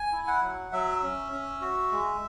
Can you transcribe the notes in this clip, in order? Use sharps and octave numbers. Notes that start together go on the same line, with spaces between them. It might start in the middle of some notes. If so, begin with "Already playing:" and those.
Already playing: G#5
E4
F#5
F#3
F#3 E5
C#4
C#4
F#4
G#3